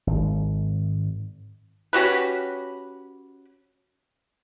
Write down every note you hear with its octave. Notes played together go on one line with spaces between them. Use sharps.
G#1
C#4 F#4 G4 B4